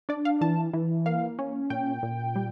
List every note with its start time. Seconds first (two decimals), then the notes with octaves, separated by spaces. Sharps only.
0.09 D4 D5
0.25 F5
0.41 E3 A5
0.73 E3
1.06 A#3 F5
1.39 C#4
1.70 A#2 G5
2.03 A#2
2.36 G3